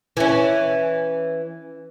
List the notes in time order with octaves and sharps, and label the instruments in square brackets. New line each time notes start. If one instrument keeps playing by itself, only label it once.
[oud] E3 C#4